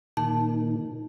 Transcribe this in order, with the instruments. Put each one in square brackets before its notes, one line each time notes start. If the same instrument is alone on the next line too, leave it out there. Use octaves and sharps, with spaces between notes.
[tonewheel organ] A#2 D#3 [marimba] A5